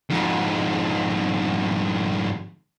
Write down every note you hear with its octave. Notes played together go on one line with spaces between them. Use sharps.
F2 G#2